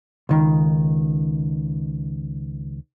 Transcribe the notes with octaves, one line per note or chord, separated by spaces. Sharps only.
C#2 D#3